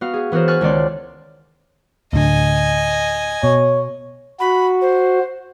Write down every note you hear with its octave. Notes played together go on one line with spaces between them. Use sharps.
B3 F#4 F5
G#4
E3 B3 F#4 A#4 C5
G#5 C#6 F6 F#6 A6
C#2 D#3 C#4 D5 C6
D2 A2 D3 D#5 G#5
B2 C#5
F#4 B5
C5